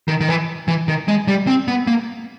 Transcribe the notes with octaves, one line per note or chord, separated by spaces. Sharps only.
D#3
D#3
E3
E3
D#3
G#3
G3
C4
B3
A#3